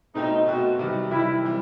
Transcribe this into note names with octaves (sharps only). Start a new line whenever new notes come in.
B2 A3 C4 D#4
B2 A3 C4 F#4
C3 D#3 G3
C3 D#3 G3 E4
E3 G3 C4